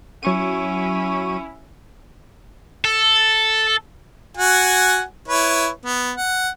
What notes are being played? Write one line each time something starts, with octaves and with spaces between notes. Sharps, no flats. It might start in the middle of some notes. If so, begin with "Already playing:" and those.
F#3 C#4 E4 C#6 D#7
A4
F#4 F#5 G#5
E4 B4 C#5
B3
F#5